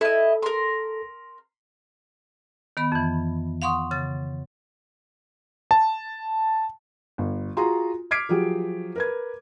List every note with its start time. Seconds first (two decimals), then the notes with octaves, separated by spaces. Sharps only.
0.01 E4 A4 D#5
0.43 A#4 C6
2.77 D#3 B3 B5
2.92 F2 E3
3.62 F5 F#5 C6 C#6 D#6
3.91 C#3 A6
5.71 A5
7.18 G1
7.57 F4 F#4 G#4 A#5 C6
8.11 D6 F6 G#6 B6 C7 D7
8.29 F3 F#3 G4 G#4
8.96 A#4 B4 G#6